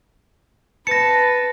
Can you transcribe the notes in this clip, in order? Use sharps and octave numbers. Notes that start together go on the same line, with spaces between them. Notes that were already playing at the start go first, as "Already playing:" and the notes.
B4 A5 A#6 C#7